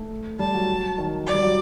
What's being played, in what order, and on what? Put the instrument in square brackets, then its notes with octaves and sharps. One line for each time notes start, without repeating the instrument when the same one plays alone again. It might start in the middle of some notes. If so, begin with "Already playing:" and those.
Already playing: [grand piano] A3
[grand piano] G3 [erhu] A5
[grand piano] F#3
D#3
[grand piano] F#3 [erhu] D5
[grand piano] G3
F#3